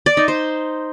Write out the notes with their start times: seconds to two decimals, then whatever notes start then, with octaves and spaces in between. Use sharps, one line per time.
0.06 D5
0.17 D#4
0.28 C5